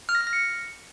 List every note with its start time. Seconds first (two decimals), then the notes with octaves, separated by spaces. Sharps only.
0.09 F6
0.15 A#6
0.21 F6
0.27 A#6
0.33 C#7